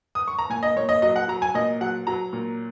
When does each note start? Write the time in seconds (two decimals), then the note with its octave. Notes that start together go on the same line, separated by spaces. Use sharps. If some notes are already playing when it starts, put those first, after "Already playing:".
0.15 D#6
0.28 C#6
0.39 A#5
0.50 A#2 G#5
0.63 D#5
0.77 A#2 C#5
0.89 D#5
1.02 F#3 D#5
1.16 F#5
1.28 F#3 A#5
1.42 G#5
1.54 A#2 D#5
1.81 F#3 F#5
2.07 F#3 A#5
2.33 A#2